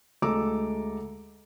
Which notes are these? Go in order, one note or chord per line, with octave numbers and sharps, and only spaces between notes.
D2 G#3 A4 A#5 D6 E6